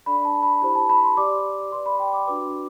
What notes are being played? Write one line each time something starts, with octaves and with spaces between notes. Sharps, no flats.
D4 A4 D5 B5
A5
B5
E4 G4 C5 B5
A5
B5
C6
G4 D5 D6
G4 B4 D5 C6
B5
G5
D6
D4 F#4 B4 D6